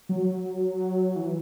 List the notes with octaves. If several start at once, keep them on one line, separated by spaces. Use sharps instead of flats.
F#3
E3